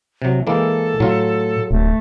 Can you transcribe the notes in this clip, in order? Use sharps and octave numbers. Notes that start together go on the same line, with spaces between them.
C3 F#3
E3 G#3 A#3 A4
A2 F#3 F4
D1 A3